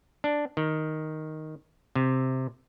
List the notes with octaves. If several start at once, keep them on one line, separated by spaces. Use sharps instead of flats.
D4
D#3
C3